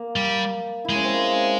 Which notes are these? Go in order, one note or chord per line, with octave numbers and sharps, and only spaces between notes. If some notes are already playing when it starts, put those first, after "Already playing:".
Already playing: A#3
G3
G#3 E4
C#4
C4
A#3
C#4